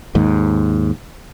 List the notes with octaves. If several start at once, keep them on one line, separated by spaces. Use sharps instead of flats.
D#2 G#2